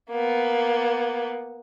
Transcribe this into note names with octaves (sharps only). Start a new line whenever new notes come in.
A#3 B3